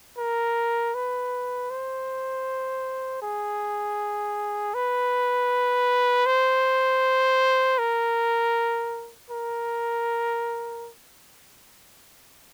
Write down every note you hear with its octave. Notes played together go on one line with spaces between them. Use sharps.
A#4
B4
C5
G#4
B4
C5
A#4
A#4